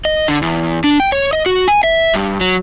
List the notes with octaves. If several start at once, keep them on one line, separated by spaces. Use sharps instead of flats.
D#5
D3
E2
D4
G5
C#5
D#5
F#4
G#5
E5
G2
F#3